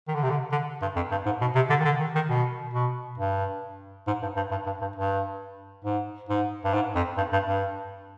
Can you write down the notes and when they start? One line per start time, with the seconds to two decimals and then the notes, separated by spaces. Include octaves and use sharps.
0.08 D#3
0.15 D3
0.23 C3
0.30 D3
0.52 D3
0.82 G2
0.96 F2
1.11 G2
1.26 G#2
1.41 B2
1.55 C3
1.70 D3
1.80 D#3
1.85 D3
2.00 D#3
2.15 D#3
2.30 B2
2.74 B2
3.18 G2
4.07 G#2
4.22 G2
4.36 G2
4.51 G2
4.66 G2
4.81 G2
4.96 G2
5.84 G#2
6.29 G#2
6.65 G2
6.73 G#2
6.95 F2
7.17 G2
7.33 G2
7.47 G2